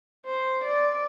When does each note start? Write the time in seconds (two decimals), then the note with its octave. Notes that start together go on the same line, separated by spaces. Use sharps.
0.26 C5
0.63 D5